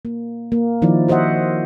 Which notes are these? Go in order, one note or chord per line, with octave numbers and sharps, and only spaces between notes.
A#3
A#3
D#3 F3 D#4 E4 D5
F#4 C5 D#5 E5 F#5